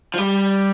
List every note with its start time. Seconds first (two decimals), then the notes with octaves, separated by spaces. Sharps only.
0.14 F3
0.18 G3